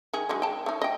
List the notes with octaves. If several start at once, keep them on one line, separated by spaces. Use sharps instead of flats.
D#3 G#4
D#3 F#3 G#3
G5 A5
A3 D#4
D#5 G5